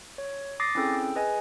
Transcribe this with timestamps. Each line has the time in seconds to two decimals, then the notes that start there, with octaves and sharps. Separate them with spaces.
0.18 C#5
0.60 D6 D#6 A6 A#6 C7
0.75 C4 C#4 E4 G#4 A4 G5
1.15 G#4 B4 D#5 G#5